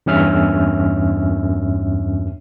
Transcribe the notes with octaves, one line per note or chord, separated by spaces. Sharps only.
E2 G2 C#4 E5 F6